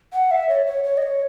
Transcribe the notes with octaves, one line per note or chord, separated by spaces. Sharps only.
F#5
E5
C#5
C#5
C#5
D#5
C#5